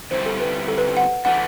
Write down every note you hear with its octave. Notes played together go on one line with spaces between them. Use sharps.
D3 G3 C4 E4 C5
A4
B4
A4
B4
F#5
E3 A3 D4 F#5